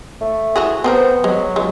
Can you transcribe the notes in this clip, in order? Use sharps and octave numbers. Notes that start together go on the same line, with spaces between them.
A3
E3 F#4 G#4
B3 C4 G#4 A#4 C5
F#3 G#3
C#2 G#3